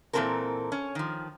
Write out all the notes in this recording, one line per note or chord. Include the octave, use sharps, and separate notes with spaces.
A#2 E3 G3 C4 A4 A#4
C#4
D#3 F3